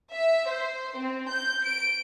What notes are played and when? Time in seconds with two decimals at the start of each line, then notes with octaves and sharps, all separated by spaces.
0.15 E5
0.50 C5
0.97 C4
1.31 G6
1.65 D7